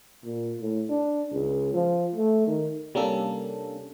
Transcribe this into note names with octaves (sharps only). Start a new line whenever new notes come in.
A#2
A2
D4
C#2
F3
A3
D#3
C3 G3 A#3 C#4 D4 A4